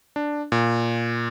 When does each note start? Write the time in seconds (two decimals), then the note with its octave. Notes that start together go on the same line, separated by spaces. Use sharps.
0.16 D4
0.52 A#2